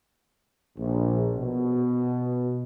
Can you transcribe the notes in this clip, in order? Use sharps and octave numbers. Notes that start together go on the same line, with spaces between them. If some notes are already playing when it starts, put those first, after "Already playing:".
A#1
B2